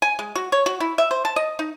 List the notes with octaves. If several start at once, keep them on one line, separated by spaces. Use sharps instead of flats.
G#5
G#3
F#4
C#5
F#4
E4
E5
C5
A5
D#5
D#4